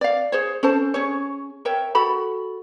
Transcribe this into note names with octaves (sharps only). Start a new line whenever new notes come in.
D5 F5
G#4 C5 C#5
C#4 A4 C5 A5
C#4 G#4 C#5
A#4 C#5 E5 G5
F#4 A4 B5